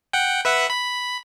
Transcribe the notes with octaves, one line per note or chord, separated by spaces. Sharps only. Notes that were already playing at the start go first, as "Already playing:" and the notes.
F#5 G5
B4 E5 F#5
B5